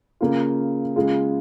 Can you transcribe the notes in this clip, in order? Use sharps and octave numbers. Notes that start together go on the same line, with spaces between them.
C#3 A#3 F4
C#3 G#3 F4